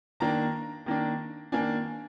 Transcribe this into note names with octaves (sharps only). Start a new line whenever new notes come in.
D#3 A#3 D4 A#5
D#3 A#3 D4
D#3 A#3 D4 G#5